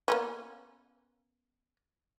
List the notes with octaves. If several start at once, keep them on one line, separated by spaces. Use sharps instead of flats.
A#3 B3 C#4